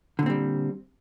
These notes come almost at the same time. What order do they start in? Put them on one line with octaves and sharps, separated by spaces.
D3 A#2 C4 G3